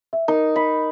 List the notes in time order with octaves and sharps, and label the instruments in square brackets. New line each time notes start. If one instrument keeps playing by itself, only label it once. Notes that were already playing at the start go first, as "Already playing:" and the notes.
[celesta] E5
[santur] D#4 [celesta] A#4
[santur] B5